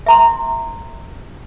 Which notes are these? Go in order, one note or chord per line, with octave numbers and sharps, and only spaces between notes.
E5 A#5 C6